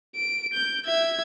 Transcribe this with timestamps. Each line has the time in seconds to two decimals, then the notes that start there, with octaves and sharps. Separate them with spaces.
0.16 D7
0.54 G6
0.86 E5 G#6